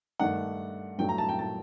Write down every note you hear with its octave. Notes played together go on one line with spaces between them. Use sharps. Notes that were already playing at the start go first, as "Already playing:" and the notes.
G2 D#3 A3 D4 F#5
G2 F#3 A3 G5
A#5
A5
G5
A5